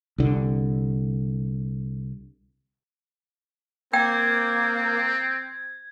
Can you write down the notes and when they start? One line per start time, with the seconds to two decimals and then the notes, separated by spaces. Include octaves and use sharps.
0.18 C2 D3
3.93 A#3 C4 G5 G#6